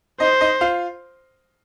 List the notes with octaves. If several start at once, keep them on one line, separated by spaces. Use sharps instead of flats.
D#4 C5 D#5
D#4 D#5
F4 F5